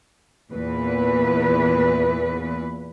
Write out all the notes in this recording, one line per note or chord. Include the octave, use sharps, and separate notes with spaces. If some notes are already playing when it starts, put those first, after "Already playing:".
E2 A#2 E3 B4